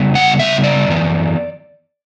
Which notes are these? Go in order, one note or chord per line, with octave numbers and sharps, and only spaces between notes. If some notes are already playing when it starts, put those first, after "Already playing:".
Already playing: C#3 G3 B3
F#5
C#3 G3 B3 E5
D5
F#2 E3 B3